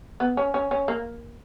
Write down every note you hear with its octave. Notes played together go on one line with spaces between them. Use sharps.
B3
C#4
C#4
C#4
A#3